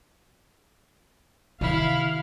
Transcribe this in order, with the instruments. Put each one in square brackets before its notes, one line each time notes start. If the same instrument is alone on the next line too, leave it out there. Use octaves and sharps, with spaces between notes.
[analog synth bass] C3 [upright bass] D#3 [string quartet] E4 [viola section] F5